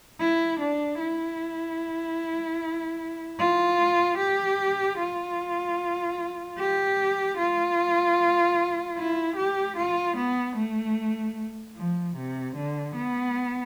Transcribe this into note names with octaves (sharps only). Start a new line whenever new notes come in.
E4
D4
E4
F4
G4
F4
G4
F4
E4
G4
F4
B3
A3
F3
C3
D3
B3